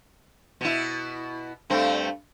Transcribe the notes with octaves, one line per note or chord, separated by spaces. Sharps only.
B2 E4
G2 A3 C4